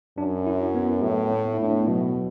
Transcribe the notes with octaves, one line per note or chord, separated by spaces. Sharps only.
F#2 D4
E4
B3
A2
A3
E4
A2 D4
B3
A3
B2 F#3